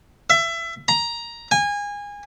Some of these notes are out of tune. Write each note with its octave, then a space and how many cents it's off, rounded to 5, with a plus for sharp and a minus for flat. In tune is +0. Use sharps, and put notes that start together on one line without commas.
E5 +25
A#5 +10
G#5 -25